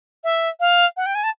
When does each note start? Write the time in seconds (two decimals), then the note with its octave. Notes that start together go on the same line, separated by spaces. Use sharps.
0.24 E5
0.60 F5
0.97 F#5
1.06 G5
1.15 G#5
1.24 A5